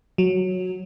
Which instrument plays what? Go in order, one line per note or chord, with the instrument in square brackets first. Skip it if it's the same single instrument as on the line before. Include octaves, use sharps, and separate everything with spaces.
[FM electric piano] F#3